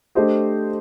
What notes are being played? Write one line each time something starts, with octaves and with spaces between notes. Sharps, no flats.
A3 D4 G4 C5 D#5